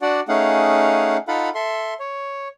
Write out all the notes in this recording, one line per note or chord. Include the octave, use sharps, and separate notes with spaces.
D4 F#4 D5 F#5
A3 C#4 D#4 G#4 F5 F#5
D#4 F4 A4 F5 F#5 B5
A4 E5 C6
C#5